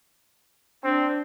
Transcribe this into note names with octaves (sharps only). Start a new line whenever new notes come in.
C4 D4